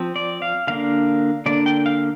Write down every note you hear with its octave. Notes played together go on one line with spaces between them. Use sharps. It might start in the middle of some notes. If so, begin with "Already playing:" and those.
Already playing: F3 C4
D5
F5
D3 A#3 D4 F5
D3 A#3 D4 D5
G5
F5